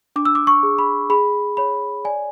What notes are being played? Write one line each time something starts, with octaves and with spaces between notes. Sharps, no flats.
D4 D6
E6
D6
C#6
G#4
B5
G#4 B5
C#5 B5
D5 G#5